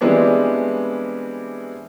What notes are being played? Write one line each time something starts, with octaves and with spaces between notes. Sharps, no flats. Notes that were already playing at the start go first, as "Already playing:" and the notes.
E3 G3 G#3 B3 C4 D4